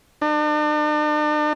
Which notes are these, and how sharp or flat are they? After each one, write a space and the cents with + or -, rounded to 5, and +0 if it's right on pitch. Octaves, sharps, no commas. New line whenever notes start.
D4 +45